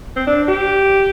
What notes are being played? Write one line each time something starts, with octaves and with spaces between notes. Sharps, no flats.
C4
D4
G4